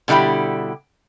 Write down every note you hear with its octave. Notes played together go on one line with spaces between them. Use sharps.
B2 D3 G3 E4 G4